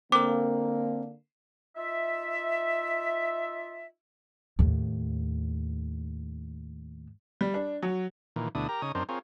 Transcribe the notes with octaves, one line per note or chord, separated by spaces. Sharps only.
D3 A#3 C4 A#4 D6
D#4 F4 E5
D#2 A2
G3
D4
F#3
A#2 D#3 E3
D2 B2 D4 E4 D#6
G4 A#4 A#5
C#3 D#4 C#5 D#6
F#2 C4 D4 D#4 A#4 C5
C4 F4 G#4 A#4 C#5